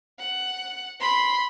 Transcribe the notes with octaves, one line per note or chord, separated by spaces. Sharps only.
F#5
B5 C6